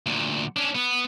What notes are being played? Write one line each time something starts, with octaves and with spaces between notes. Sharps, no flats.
D2 A#2
C#4 D4
B3